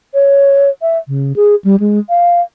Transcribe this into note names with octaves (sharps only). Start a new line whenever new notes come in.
C#5
E5
C#3
G#4
G3
G#3
F5